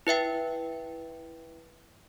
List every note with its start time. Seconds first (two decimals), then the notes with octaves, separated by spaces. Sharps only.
0.07 E4 B4 E5 G5